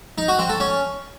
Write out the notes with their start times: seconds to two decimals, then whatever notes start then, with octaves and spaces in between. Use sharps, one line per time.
0.18 D#4
0.28 F#4
0.39 C4
0.50 A4
0.60 C#4